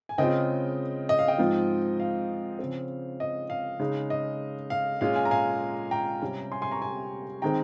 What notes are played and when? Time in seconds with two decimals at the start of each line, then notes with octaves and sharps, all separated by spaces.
0.09 G#5
0.18 C#3 G#3 C4 F4 D#5 G5
1.09 D#5
1.19 F5
1.28 D#5 G5
1.38 G#2 F3 C4 F4
2.00 F5
2.59 C#3 F3 C4
3.20 D#5
3.50 F5
3.80 C#3 G#3 D#4
4.10 D#5
4.70 F5
5.01 A#2 G#3 C#4 F4 F5
5.16 F5 G#5
5.25 A#5
5.31 F5 G#5
5.91 G5 A#5
6.22 C3 G3 C#4
6.52 G#5 C6
6.62 G#5 C6
6.71 A#5 C#6
6.81 G#5 C6
7.42 D#3 G#3 C4 G5 A#5